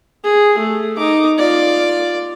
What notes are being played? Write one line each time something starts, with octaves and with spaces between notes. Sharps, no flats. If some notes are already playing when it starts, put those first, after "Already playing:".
G#4
A3
D#4 D6
F4 D5